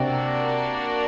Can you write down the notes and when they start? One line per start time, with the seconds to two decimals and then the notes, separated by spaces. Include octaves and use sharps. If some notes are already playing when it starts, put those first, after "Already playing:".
Already playing: C3 A#3 D4 F#4 A#4 D5